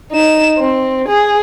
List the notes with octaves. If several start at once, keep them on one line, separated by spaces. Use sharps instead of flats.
D#4 E7
C4
G#4